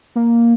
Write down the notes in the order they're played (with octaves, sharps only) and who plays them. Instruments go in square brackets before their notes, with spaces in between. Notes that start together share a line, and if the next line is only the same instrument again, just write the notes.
[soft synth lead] A#3